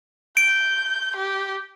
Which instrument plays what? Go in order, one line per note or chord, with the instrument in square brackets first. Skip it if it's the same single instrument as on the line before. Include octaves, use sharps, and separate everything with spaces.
[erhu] G6 [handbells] D7
[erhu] G4